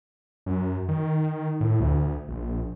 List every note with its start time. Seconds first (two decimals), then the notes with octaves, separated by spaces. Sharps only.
0.46 F#2
0.88 D#3
1.60 A2
1.80 D2
2.28 A#1